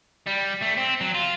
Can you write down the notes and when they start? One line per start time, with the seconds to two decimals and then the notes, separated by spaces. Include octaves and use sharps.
0.26 G3
0.61 A3
0.77 C4
1.01 F#3
1.15 F4